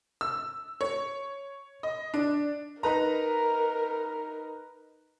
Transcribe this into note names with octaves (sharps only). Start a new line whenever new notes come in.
E6
C#5
D#5
D4
D#4 A#4 B4 A#5